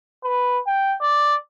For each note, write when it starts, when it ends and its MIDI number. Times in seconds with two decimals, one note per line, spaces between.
0.24 0.59 71
0.67 0.96 79
1.01 1.35 74